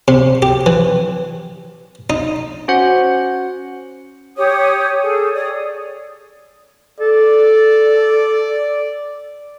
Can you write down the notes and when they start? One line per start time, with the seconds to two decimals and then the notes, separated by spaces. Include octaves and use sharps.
0.08 C3
0.42 G4
0.66 E3
2.10 D#4
2.68 C#4 F#4 C5 F#5
4.36 G4 C#5 D#6
5.02 G#4 A4
5.34 C#5 D5 D#6
7.00 A4 D5